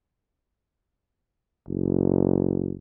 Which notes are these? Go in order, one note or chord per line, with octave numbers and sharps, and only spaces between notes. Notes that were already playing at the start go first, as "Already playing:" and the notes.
F#1